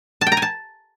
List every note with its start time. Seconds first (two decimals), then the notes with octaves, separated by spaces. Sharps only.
0.21 A5
0.27 G5
0.32 A#5
0.37 G#5
0.42 A5